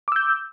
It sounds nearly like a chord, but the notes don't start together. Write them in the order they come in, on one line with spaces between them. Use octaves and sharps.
D6 E6 G6